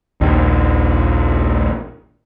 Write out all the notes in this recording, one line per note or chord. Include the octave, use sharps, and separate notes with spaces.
A#1 D#2 D#3